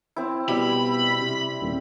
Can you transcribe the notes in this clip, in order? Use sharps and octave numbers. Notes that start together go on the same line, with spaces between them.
C4 E4
B2 G3 E4 B5
C3
D#1